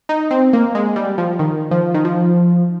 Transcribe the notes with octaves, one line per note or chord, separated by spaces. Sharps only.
D#4
C4
A#3
G#3
G3
F3
D#3
F3
D#3
F3